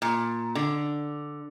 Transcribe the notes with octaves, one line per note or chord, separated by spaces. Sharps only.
A#2
D3